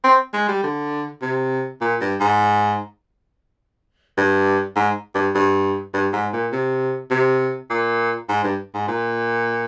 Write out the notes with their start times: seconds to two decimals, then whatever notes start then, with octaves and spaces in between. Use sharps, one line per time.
0.04 C4
0.34 G#3
0.49 G3
0.63 D3
1.22 C3
1.81 A#2
2.01 G2
2.20 G#2
4.17 G2
4.76 G#2
5.15 G2
5.35 G2
5.94 G2
6.13 G#2
6.33 A#2
6.52 C3
7.11 C3
7.70 A#2
8.29 G#2
8.44 G2
8.74 G#2
8.88 A#2